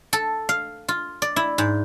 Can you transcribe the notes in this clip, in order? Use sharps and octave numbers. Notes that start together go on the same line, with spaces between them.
A4
F5
F4
D5
E4
G#2